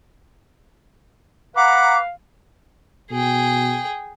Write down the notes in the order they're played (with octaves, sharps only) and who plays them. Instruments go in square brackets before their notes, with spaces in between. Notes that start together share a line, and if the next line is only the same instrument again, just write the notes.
[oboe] B4 [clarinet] F5 [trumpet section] F#5 A#5 [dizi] D6
[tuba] B2 [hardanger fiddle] G#4 G5